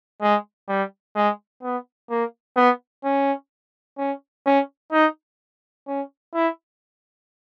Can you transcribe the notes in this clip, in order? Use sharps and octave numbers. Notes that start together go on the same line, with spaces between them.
G#3
G3
G#3
B3
A#3
B3
C#4
C#4
C#4
D#4
C#4
E4